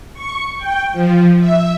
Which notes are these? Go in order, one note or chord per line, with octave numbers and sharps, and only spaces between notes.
C#6
G5
F3
E5